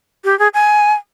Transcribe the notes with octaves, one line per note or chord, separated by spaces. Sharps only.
G4
G#4
G#5